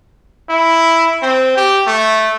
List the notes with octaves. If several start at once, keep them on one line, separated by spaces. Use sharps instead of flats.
E4
C4
G4
A3